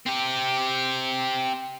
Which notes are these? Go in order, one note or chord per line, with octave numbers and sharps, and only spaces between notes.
C4 G4